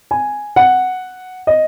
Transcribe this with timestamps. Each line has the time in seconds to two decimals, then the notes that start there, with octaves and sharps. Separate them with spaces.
0.11 G#5
0.56 F#5
1.47 D#5